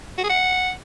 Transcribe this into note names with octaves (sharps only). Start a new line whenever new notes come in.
F#4
G#4
F#5